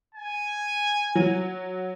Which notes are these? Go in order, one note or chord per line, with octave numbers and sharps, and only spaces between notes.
G#5
F#3